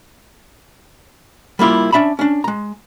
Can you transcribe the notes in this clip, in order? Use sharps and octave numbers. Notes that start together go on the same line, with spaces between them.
G3 A#3 E4 F4 G4
C#4 D4 E5 A5 B5
C#4 D4
G#3 A#5